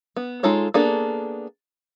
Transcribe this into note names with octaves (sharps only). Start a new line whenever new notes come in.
B3
G#3 D#4 F4 A4 C#5
A#3 B3 D4 G#4 A4